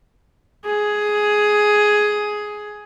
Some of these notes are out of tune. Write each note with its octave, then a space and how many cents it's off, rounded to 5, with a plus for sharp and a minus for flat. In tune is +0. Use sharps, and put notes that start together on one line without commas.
G#4 +10